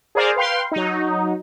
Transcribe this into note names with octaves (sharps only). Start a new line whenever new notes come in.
G#4 A#4 C5 D5 F5
B4 F5 G5 C6
F#3 D#4